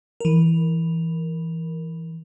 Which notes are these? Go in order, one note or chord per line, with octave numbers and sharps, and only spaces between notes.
E3 A#4